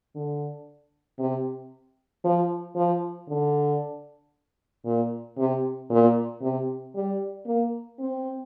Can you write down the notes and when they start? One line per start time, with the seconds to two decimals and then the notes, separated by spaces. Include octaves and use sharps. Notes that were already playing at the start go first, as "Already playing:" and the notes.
0.15 D3
1.19 C3
2.24 F3
2.76 F3
3.28 D3
4.85 A#2
5.38 C3
5.90 A#2
6.42 C3
6.95 G3
7.46 A#3
7.99 C4